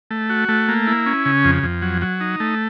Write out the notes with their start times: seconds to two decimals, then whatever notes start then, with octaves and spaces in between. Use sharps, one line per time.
0.11 A3
0.30 F#4
0.49 A3
0.68 A#3
0.87 E4
1.06 C#4
1.26 C#3
1.44 F2
1.63 F2
1.82 F#3
2.01 F#3
2.21 D#4
2.40 A3